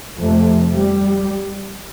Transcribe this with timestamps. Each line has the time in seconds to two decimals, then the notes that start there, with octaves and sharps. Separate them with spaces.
0.20 F2 C3 A3
0.76 G3